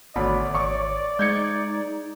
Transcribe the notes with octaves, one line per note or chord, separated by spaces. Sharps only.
G#1 D2 B2 C#5 D5 B5
G#1 C#6 D6
G#3 D#4 G6 G#6 C#7